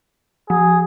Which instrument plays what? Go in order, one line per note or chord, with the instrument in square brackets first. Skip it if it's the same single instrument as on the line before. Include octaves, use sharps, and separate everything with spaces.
[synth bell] F3 [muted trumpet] G#4